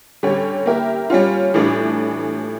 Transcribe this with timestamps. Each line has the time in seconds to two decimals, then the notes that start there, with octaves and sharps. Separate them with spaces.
0.23 D3 G3 C#4 G4 C#5
0.66 A#3 E4 G4 A#4
1.10 G3 C#4 F4
1.54 A2 E3 G3 D4